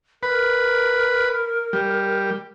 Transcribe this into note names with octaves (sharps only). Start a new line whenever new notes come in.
A#4 B4
G3